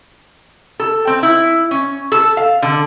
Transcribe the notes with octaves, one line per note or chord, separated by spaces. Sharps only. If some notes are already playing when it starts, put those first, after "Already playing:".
A4
C4
E4
C#4
A4
F5
D3